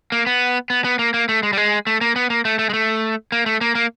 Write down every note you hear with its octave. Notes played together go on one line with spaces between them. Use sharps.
A#3
B3
B3
B3
A#3
A#3
A3
G#3
G3
G#3
A3
A#3
B3
A#3
A3
A3
G#3
A3
A#3
A3
A#3
A#3